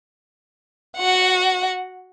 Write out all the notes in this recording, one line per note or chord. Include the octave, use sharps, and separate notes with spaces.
F#4 F#5